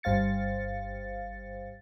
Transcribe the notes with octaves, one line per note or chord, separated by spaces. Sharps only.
G1 G2 C5 F5 A6 C#7